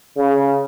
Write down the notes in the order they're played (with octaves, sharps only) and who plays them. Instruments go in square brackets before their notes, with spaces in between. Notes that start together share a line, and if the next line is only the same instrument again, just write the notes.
[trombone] C#3